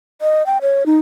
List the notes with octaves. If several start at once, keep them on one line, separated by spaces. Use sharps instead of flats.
D#5
G5
C#5
D#4